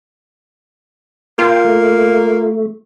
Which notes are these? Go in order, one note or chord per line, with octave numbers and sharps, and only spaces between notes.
A#3 F4 F5 G5
A3